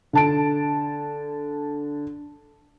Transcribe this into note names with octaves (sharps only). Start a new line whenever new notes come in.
D3 A5 D7